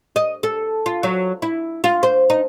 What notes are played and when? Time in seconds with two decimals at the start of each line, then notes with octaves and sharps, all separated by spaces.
0.16 D#5
0.43 A4
0.86 F4
1.03 F#3
1.42 E4
1.84 F4
2.03 C5
2.30 D#4